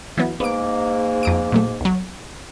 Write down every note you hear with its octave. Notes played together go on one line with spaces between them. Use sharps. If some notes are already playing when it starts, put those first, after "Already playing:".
E3 F#3 B3
G#2 A#3 B3 D7
F2 D#6 D7
A#2 F#3 A3
B1 F#3